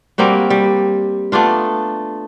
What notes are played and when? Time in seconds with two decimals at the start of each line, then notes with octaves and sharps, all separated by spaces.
0.18 G3 A#3 C4 F#4
0.50 G3
1.32 A3 B3 D4 F4